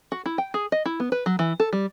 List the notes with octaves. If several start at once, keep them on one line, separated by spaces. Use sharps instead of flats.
F#4
E4
G5
G#4
D#5
E4
B3
B4
F#3
E3
A4
G3